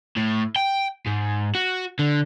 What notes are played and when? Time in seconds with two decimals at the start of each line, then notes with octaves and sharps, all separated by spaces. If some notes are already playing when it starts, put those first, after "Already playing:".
0.16 A2
0.56 G5
1.06 G#2
1.55 F#4
1.99 D3